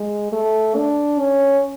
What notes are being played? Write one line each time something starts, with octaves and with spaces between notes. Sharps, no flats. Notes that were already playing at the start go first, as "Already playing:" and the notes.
Already playing: G#3
A3
D4
C#4